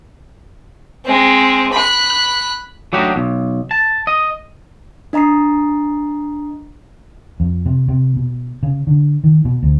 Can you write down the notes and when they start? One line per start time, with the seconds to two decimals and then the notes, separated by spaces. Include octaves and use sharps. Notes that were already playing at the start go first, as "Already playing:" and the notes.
1.05 G#3 C4
1.73 B5 F#6
2.93 F#3 A3 D4 D#4 F#4 G4
3.16 B1
3.71 A5
4.07 D#5
5.13 D4 D#5 A#5 D#6 C7
7.40 F2
7.66 C3
7.89 C3
8.17 B2
8.63 C#3
8.87 D3
9.24 D#3
9.45 B2
9.63 D2